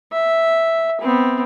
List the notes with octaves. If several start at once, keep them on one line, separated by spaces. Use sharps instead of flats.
E5
B3 C4